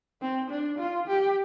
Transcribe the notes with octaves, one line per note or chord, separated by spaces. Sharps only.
C4
D4
F4
G4